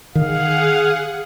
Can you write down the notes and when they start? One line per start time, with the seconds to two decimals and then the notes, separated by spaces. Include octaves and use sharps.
0.15 D#3 G#4 F5 F#5